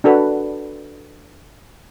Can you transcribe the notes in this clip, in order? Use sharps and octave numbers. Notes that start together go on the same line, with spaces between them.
D4 F#4 A4 B4